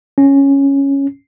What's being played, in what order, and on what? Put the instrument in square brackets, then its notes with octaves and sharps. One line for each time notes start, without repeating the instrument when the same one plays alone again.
[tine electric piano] C#4